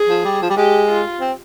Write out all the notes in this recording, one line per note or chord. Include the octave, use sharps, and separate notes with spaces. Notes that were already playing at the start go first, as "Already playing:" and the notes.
Already playing: G#4
F3
G3
F3
G3
G#3 G4
F4
C4